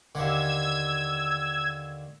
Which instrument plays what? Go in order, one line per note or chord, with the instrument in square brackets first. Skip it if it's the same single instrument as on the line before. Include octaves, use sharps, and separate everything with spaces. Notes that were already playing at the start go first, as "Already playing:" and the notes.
[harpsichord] D#2 D3 [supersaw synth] E6 G#6